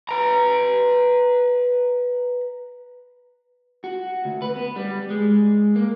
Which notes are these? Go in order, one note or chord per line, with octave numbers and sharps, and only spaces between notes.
B4 A#5
F#4
D2
B4
B3
G3
G#3
A#3